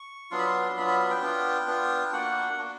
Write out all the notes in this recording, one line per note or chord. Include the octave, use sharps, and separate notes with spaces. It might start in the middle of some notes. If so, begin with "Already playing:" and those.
Already playing: C#6
F#3 B3 D4 F4 C6
B5
C6
F#3 B3 D4 F4 B5
B5
B5
G5
B3 D4 F4
B3 D4 F4
A#3 D4 F#4 F#5
A#3 D4 F#4